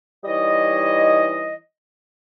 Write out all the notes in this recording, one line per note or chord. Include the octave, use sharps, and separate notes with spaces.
E3 G3 D#4 C#5 D#5